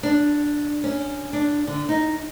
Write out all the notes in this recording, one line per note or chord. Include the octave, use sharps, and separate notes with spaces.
D4
C#4
D4
D3
D#4